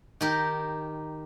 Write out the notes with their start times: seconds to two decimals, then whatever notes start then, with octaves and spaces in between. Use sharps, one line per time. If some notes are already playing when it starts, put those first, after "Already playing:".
0.21 D#3 G4 A#4